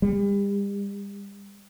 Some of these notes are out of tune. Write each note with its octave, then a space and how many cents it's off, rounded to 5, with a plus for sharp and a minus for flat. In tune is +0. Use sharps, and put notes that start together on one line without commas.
G3 +40